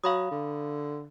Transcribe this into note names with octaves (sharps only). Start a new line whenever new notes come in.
F#3 F5 B5 D#6
D3